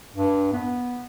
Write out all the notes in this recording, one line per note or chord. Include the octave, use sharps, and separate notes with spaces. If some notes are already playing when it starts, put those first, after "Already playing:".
G2
B3